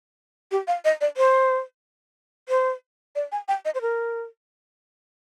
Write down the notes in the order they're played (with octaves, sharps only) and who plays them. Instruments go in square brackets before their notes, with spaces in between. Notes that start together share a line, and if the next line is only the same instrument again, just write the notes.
[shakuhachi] G4
F5
D#5
D5
C5
C5
D5
G#5
G5
D#5
C5
A#4